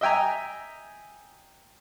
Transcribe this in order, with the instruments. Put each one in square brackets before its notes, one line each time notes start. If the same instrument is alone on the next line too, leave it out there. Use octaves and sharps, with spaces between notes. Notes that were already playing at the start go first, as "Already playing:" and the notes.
[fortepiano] D#5 E5 G5 G#5 A#5